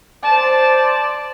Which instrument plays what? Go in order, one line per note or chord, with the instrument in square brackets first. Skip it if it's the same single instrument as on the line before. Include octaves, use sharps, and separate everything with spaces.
[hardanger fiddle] C5 A5 [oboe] D5